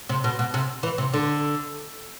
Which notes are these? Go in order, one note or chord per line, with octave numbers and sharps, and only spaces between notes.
C3
B2
B2
C3
E3
C3
D3